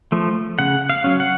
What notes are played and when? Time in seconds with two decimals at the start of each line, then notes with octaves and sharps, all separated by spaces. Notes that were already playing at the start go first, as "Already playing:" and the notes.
0.12 F3 A3
0.59 C#3 F#5
0.90 F5
1.04 F#3 C#4
1.20 F#5